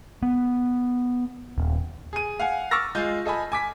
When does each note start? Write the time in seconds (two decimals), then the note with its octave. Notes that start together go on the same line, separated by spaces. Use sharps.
0.23 B3
1.58 D#1
2.13 G#4 D#7
2.40 F5 F#5 G#5
2.71 C#6 D6 E6 F6 A6 A#6
2.95 G#3 F4 G6
3.26 A4 D#5 G#5 B5
3.52 G#5 D6 B6